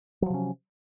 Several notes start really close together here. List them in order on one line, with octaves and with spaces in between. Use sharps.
F#3 F3 C3 C#4